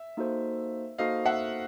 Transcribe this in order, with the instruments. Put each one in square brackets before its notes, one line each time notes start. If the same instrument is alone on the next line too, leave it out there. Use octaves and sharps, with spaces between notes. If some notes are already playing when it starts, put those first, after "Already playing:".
Already playing: [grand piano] E5
[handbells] A#3 D#4 F#4 A4 C5
[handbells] A#3 D#4 F#4 A4 C5 [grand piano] D#5 F5
[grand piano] E5 F#5